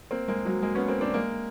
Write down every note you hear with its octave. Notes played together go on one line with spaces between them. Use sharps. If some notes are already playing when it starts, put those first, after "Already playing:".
A#3 C4
G#3 A#3
F#3 G#3
G#3 A#3
B3 C#4
A#3 C4
C4 D4
G#3 A#3